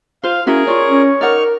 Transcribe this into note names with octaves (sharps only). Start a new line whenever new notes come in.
F4 C5 F5
C#4 E4 F#4 G#4 A#4
F4 C#5 D5
C#4
D#4 A#4 D5 F#5 C#6 F6